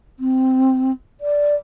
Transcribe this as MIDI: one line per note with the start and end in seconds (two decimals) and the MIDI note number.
0.19 0.92 60
1.21 1.55 74